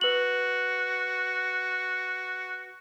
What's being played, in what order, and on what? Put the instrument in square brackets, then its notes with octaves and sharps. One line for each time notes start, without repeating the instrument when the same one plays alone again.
[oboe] F#4 [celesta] B4 F#7